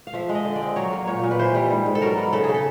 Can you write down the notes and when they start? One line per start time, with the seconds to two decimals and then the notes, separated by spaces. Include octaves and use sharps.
0.07 F5
0.13 F3 E5
0.29 G#3
0.35 D#5
0.45 D3
0.56 D5
0.62 C4
0.76 F#3 C#5
0.93 A#3
1.07 A#2 C#5
1.24 A#2
1.31 B4
1.39 E3 C5
1.55 G3
1.71 G#2
1.86 G#2
1.95 A4
2.02 F#3 A#4
2.17 B3
2.33 C#3 A4
2.44 C#3 G#4
2.54 A4